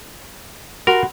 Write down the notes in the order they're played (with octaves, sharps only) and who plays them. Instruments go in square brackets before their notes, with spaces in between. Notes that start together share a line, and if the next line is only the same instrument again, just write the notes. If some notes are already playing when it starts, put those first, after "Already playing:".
[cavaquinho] F#4 B5 C6 [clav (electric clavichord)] A#4